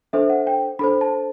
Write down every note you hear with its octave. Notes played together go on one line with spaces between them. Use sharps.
D4 A4 C5 E5
F#5
G5
D4 A4 C5 B5
A5